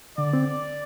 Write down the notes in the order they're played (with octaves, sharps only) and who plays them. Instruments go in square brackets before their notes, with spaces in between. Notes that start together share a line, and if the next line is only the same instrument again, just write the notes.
[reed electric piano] D3 [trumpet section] D5
[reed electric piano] C4